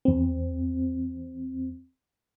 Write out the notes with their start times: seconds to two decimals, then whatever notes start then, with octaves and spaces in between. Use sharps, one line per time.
0.05 E2 C4